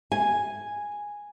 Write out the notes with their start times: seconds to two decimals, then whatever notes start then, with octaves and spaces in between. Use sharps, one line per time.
0.12 G#5